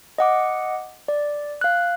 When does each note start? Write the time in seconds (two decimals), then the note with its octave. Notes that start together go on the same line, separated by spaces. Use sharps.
0.18 D#5 F#5 D6
1.08 D5
1.61 F5 F#6